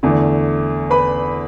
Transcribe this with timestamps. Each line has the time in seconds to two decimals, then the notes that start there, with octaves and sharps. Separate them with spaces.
0.03 E2 D3 A3
0.90 B4 B5